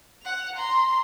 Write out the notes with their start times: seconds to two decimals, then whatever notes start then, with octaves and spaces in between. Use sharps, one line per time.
0.23 F#5 F7
0.56 A#5 C6